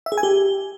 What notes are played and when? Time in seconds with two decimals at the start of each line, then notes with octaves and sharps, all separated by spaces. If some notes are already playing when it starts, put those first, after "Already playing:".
0.06 E5
0.12 G#4
0.18 G#5
0.23 G4